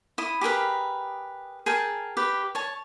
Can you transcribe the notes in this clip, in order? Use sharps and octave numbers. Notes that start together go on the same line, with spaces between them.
E4 D#6
G4 G#4 A#4 B4
G#4 A#4 G5 A5
G4 B4
C#5 A5